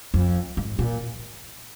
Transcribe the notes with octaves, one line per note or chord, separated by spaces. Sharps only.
F2
G#2
A#2